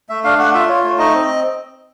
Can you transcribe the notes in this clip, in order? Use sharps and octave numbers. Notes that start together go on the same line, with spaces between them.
A3 E5
D4 F5
A3 F#5
F4 E5
F4 C#5
A3 C#5
D#4 D#5
C4